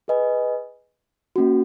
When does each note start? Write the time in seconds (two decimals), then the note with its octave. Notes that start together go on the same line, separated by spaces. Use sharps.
0.08 G#4 B4 D#5 G#5
1.36 A#3 C#4 F#4